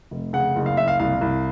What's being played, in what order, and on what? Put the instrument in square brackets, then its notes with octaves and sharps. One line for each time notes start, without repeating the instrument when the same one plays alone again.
[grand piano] F1
C#3 F#5
F#1
F5
F#1 E5
F5
C2 F5
C2